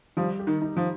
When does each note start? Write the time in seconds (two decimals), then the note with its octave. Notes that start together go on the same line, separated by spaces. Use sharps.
0.17 F3 G3
0.39 G4
0.47 D#3
0.62 D#4
0.77 F3